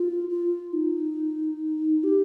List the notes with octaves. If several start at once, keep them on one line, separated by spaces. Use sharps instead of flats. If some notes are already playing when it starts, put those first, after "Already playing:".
Already playing: F4
F4
D#4
G4